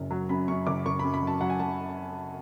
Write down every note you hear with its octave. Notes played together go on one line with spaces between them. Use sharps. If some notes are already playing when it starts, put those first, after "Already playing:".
Already playing: F#1 F#2
F#3
F#2 B5
F#2 C#6
F#1 D6
F#1 C#6
F#2 B5
B5
F#3
A5
F#3 F#5
G#5
F#3 A5